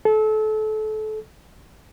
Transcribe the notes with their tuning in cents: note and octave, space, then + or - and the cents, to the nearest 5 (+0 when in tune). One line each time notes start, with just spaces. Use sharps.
A4 -30